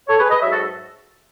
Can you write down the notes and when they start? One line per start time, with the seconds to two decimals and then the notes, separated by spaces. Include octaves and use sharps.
0.08 A4 C#5
0.19 G#4 B4
0.30 B4 D#5
0.41 G#2 F#3 C#5 E5
0.52 F#4 A4